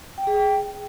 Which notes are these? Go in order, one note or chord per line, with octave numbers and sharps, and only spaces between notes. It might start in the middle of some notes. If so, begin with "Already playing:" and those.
G5
G#4
G5